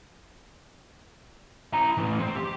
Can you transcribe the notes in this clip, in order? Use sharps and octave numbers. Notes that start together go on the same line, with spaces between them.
E4 A#5
A2 E3
C4
G4